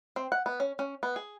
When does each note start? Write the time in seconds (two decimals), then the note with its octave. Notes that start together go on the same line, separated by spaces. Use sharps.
0.16 C4
0.32 F#5
0.46 B3
0.60 C#4
0.79 C#4
1.03 B3
1.16 G#4